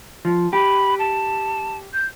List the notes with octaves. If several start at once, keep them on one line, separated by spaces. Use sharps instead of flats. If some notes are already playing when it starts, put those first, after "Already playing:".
F3
G4 B5
A5
G6